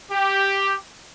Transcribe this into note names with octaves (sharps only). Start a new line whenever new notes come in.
G4